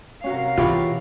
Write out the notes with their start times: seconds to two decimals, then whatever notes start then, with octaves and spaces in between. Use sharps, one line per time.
0.24 C3 C#4 F#4 A#4 F5
0.58 B2 E3 F4 G4 C#5 B5